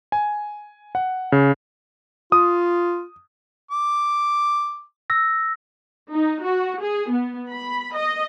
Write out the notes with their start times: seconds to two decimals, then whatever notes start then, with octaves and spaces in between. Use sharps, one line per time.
0.12 G#5
0.95 F#5
1.32 C#3
2.32 F4 D#6
3.71 D6
5.10 E6 A#6
6.13 D#4
6.45 F#4
6.82 G#4
7.11 B3
7.52 B5
7.96 D#5